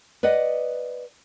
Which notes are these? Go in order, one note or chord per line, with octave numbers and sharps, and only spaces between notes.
B4 D5 D#5 F#5